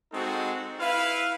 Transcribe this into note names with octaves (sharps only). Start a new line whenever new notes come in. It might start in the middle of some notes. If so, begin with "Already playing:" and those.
G#3 C4 D#4 F#4 A4
E4 B4 F5